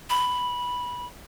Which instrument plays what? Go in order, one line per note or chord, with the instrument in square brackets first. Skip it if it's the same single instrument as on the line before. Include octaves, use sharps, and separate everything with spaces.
[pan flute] B5